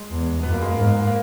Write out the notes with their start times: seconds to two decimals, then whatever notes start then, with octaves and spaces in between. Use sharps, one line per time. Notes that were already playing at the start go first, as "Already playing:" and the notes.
Already playing: G#3
0.11 E2
0.43 F#2 B3
0.53 A#3
0.61 G#3
0.71 G#2 A#3
1.07 A#3